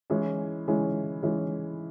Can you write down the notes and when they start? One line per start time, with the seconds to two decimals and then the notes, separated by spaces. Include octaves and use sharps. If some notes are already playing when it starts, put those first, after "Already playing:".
0.10 E3 G#3 C#4 E4
0.67 E3 G#3 C#4 E4
1.22 E3 G#3 C#4 E4